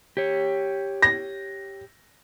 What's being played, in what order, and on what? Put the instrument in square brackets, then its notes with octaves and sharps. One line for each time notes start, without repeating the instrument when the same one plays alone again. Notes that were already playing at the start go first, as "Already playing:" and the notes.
[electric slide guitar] G4 C#5
[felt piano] A#6